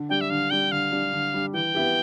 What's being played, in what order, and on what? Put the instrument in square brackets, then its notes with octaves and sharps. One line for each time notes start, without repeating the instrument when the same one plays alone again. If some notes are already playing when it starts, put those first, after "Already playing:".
Already playing: [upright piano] D3
[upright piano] G3 D4 [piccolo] G5
[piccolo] E5
[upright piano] D3 [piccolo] F5
[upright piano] G3 D4 [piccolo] G5
[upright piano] D3 [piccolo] F5
[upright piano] G3 D4
D3
G3 D4
[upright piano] E3 [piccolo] G5
[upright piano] B3 E4 G4